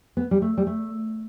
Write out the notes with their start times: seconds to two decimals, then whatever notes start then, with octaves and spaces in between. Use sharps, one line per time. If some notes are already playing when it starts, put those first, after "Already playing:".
0.17 B3
0.31 G3
0.42 A3
0.57 G3
0.67 A3